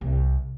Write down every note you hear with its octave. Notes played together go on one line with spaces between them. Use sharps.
C2